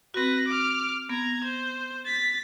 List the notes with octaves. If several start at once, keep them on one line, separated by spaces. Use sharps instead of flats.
C4 F#4 B4 A#6
D6 F6
B3 A#5 G#6
C5
A6 B6